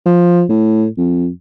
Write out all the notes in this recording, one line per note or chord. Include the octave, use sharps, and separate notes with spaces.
F3
A2
F2